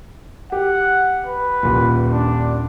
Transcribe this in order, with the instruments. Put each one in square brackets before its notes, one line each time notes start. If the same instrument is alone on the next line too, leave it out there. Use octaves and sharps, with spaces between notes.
[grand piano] G4 [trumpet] F#5
[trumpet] B4
[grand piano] D#1 A#2
[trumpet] D4